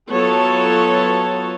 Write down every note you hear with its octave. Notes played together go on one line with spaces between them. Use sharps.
F#3 B3 F4 A4 C#5 A5